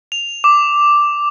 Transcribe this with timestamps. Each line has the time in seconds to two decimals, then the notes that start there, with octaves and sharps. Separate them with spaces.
0.12 F7
0.44 D6